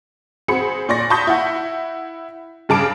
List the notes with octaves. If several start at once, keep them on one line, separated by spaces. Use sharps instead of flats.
C4 F#4 G#4 B5 C#7
A#2 D5 C#6 A#6
A5 B5 C#6 D#6 G6 B6
E4 F#5
G2 C#3 G#4 A5 D6 D7